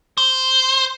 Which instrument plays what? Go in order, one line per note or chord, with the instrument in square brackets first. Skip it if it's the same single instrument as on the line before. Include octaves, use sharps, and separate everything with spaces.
[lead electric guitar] C5